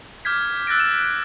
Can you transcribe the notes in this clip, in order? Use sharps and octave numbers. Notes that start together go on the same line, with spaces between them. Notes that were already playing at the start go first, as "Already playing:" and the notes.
D6 F6 G6 G#6 B6
E6 F#6 A6 A#6 D7
E7